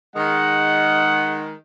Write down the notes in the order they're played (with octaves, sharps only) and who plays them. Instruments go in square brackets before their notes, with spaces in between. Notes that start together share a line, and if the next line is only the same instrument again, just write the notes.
[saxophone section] D#3 G#3 [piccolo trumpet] F#5